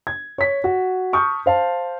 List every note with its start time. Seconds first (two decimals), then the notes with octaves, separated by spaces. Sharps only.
0.07 G#6
0.38 C#5 B6
0.64 F#4
1.13 A5 C#6 D#6 F6 G6
1.46 C5 F5 A5